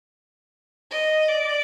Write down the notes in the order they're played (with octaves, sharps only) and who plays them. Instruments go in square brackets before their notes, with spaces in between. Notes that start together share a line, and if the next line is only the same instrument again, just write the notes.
[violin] D#5
D5